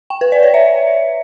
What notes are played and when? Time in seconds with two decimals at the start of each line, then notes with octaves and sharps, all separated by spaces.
0.10 G5
0.21 B4
0.32 D5
0.43 C#5
0.54 E5